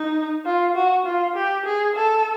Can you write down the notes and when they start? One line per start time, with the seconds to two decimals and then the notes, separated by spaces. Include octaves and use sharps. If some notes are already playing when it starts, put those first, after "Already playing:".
Already playing: D#4
0.45 F4
0.76 F#4
1.06 F4
1.36 G4
1.66 G#4
1.95 A4